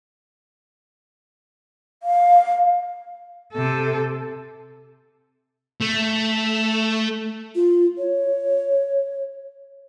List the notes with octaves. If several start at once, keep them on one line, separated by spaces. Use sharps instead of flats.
F5
C3 A4
A3
F4
C#5